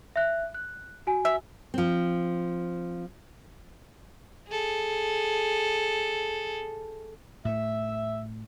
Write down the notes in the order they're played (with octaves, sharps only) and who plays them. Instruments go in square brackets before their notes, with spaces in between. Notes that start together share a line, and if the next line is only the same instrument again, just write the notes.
[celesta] E5 F#6
F#6
F#4 G#5
[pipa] E5
[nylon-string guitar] F3 C4
[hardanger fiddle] G#4 A4
[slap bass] A2 A3 [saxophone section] E5